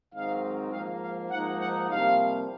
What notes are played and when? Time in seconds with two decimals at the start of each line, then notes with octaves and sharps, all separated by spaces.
0.14 G#2 D#3 F#3 C4 D#4 F5
0.72 G#2 F3 A#3 F5
1.02 F5
1.31 G#2 F3 A#3 D#4 F#5
1.60 F#5
1.90 C2 C3 F3 A#3 F5